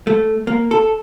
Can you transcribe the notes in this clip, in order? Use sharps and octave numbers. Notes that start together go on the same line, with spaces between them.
A3
A#3
A4